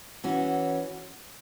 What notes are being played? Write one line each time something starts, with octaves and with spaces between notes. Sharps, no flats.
E3 C#4 F#4